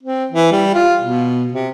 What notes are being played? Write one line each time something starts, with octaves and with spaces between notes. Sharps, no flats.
C4
E3
G3
F4
B2
C3